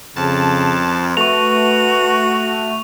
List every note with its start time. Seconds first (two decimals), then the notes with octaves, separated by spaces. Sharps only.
0.16 F2 C#3 A5
1.17 A3 F#4 B4 C#6 F7